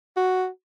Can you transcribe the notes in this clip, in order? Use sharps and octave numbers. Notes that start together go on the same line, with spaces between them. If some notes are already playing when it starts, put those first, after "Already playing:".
F#4